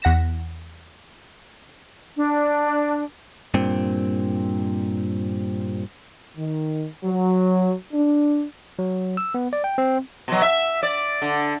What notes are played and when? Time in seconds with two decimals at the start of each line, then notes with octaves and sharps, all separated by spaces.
0.02 E2 F#5 A#6 B6 E7
2.17 D4
3.54 G2 A#2 C4
6.37 D#3
7.04 F#3
7.93 D4
8.79 F#3
9.17 E6
9.34 B3
9.53 D5
9.64 G5
9.78 C4
10.28 B2 F#3
10.42 E5
10.83 D5
11.22 D3